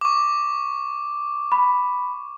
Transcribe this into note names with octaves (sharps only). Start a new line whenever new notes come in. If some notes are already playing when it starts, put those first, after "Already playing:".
C#6 D6
B5